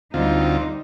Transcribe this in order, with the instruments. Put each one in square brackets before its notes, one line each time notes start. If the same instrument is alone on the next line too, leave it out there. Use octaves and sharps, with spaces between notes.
[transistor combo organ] D2 C4 F4 [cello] G3 D#4